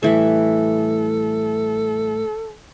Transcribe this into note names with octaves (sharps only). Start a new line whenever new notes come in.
A2 E3 G3 A4 E5